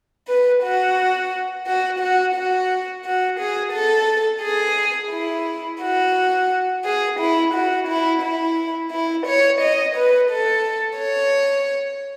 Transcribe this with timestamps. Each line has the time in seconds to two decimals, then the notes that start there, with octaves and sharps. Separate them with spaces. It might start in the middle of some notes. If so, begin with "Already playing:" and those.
0.27 B4
0.62 F#4
1.66 F#4
2.00 F#4
2.35 F#4
3.04 F#4
3.39 G#4
3.72 A4
4.42 G#4
5.11 E4
5.81 F#4
6.84 G#4
7.19 E4
7.53 F#4
7.87 E4
8.22 E4
8.91 E4
9.26 C#5
9.61 D#5
9.95 B4
10.30 A4
10.99 C#5